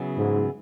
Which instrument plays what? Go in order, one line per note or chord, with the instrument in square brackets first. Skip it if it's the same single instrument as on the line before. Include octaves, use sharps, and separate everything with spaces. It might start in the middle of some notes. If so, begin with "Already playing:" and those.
Already playing: [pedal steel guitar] C#3 F#3 B3 E4 G#4
[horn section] G#2